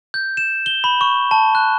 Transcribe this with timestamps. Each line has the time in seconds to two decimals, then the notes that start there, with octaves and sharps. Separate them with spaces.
0.14 G6
0.37 E7
0.66 G7
0.84 B5
1.01 C#6
1.31 A5
1.55 F#6